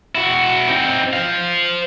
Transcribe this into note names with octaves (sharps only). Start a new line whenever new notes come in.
E4 F#4
C4 D#4
C5 F5